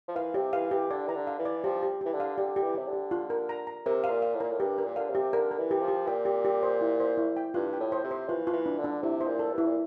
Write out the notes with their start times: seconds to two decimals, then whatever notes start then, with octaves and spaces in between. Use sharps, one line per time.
0.08 F3
0.16 E3 F5
0.34 C3 G4
0.53 E3 F5
0.71 E3 G4
0.90 D3 D5
1.07 E3 A#5
1.15 D3
1.27 F5
1.39 E3
1.45 D5
1.64 F3 G4
1.83 G4
2.01 E3 G4
2.13 D3
2.20 F5
2.38 D3 G4
2.56 G4
2.62 E3
2.75 C3 G4
2.87 D3
2.93 G4
3.11 F4
3.30 A#4
3.49 A#5
3.67 A#5
3.86 C3 A#4
4.04 F5
4.10 A#2
4.22 F5
4.35 A2
4.40 A#2 A#4
4.51 A2
4.60 G2 G4
4.78 A#4
4.84 A#2
4.96 D3 F5
5.09 C3
5.15 G4
5.33 D3 A#4
5.51 A#4
5.58 E3
5.71 G4
5.82 F3
5.88 G4
6.08 A#2 G5
6.25 G4
6.45 G4
6.63 C5
6.81 E4
7.00 C5
7.17 E4
7.37 G5
7.54 G2 F4
7.73 G5
7.80 A2
7.92 C5
8.04 C3
8.11 C5
8.28 E3 F4
8.47 F4
8.53 E3
8.66 D4
8.78 D3
8.84 D4
9.03 C3 E4
9.21 C5
9.27 A#2
9.39 A4
9.52 G2
9.58 E4
9.66 A#2